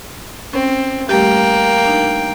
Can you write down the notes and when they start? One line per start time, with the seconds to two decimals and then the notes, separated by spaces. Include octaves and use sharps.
0.53 C4 C#4
1.09 G3 A3 A#3 G4 G5
1.85 D4 D#4